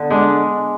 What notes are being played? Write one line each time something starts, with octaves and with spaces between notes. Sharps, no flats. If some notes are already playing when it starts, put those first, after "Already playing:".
Already playing: D3 B3
G#3 D4